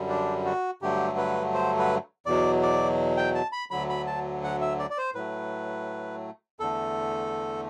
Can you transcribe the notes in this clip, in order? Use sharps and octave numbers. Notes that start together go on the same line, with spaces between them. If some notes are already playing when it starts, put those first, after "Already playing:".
Already playing: F#2 D3 G3
D4
F#4
G2 D3 F#3 A3 G4
B4
C5
B4
E2 B2 F#3 D5
D5
G5
A5
B5
D2 D3 F#3 B5
B5
A5
F#5
E5
D5
D5
C5
A2 F#3 A3 B4
E2 D3 A3 A4